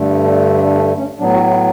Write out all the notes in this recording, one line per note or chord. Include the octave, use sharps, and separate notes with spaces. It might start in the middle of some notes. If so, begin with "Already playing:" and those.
Already playing: G2 D3 A3
D4
D4
D4
C#4
A2 F#3 B3 D4
F#4
E4